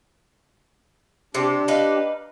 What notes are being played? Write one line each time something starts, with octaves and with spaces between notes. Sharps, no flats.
C3 D4 G4
D#4 B4 F5